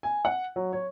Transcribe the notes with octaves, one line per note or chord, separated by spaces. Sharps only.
G#5
F#5
F#3
C#5